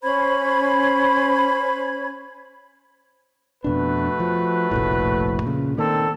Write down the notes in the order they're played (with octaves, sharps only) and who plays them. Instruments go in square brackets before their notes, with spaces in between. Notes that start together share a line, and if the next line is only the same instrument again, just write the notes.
[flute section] C#4 C5 B5 G#6
[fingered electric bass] F2 B2 D4 [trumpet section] A3 F#4 B4
[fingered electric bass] F3
F1 A#1 A2
A#2 C#3
[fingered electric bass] D#3 A#3 [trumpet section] C4 A4 D5